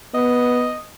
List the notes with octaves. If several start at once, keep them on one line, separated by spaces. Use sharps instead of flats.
B3 D#5